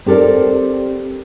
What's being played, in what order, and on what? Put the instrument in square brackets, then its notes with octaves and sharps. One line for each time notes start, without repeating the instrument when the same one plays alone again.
[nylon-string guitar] C4 G4 A4 A#4 D5